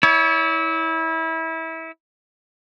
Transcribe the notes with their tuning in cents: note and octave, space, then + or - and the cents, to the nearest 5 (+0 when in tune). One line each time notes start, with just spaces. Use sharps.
E4 -25 C#5 +35